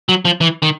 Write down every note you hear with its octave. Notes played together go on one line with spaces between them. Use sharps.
F#3
F3
E3
D#3